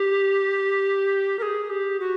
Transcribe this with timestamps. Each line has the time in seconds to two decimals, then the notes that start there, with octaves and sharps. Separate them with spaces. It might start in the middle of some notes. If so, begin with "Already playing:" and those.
Already playing: G4
1.39 A#4
1.42 G#4
1.70 G4
2.00 F#4